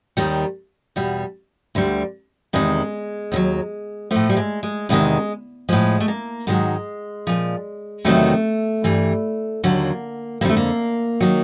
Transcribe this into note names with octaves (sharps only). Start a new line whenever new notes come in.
D#2 D#3 G3
E2 B2 G3
D2 D3 G3
E2 C3 D#3 G#3
D#2 D#3 F#3
A2 F3 A3
G3
G#3
G#3
E2 C3 D#3 G#3
A2 F3 G#3
A3
A#3
G#2 D#3 F#3 G#3
A#2 F3
E2 C3 D#3 F#3 A3
G2 E3 G3
D#2 D3 F#3 A#3
F2 D3 G3 A#3
A3
A#3
D#3 F#3